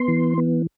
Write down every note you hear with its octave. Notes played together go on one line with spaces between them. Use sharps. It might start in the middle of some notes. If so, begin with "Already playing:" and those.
Already playing: B3 C6
E3
B3